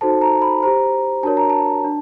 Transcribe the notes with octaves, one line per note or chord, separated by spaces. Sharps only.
D#4 F#4 A4 C5 A5
A#5
B5
G4 C5 A#5
D4 F#4 A#4 C#5 A5
A#5
A5
D4